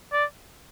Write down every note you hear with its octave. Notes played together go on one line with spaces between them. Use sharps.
D5